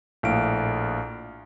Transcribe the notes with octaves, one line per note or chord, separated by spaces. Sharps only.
A#1 A2 F5 D7